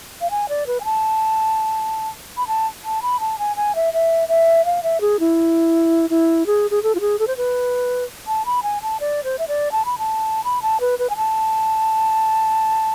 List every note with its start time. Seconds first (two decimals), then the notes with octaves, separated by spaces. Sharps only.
0.21 F5
0.31 G#5
0.49 D5
0.67 B4
0.80 G#5
0.85 A5
2.37 B5
2.47 A5
2.85 A5
3.02 B5
3.20 A5
3.38 G#5
3.56 G#5
3.75 E5
3.93 E5
4.28 E5
4.65 F5
4.83 E5
5.01 G#4
5.20 E4
6.10 E4
6.46 G#4
6.71 G#4
6.83 A4
6.95 F4
7.01 G#4
7.19 A4
7.27 C5
7.37 B4
8.27 A5
8.46 B5
8.63 G#5
8.82 A5
9.00 D5
9.24 C5
9.39 E5
9.48 D5
9.72 A5
9.85 B5
9.98 A5
10.44 B5
10.62 A5
10.80 B4
10.99 B4
11.10 G#5
11.17 A5